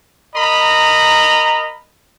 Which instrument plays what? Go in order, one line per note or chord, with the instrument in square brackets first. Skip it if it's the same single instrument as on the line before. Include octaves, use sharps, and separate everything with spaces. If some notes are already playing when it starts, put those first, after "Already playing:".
[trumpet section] A#4 D#5 A#5 B5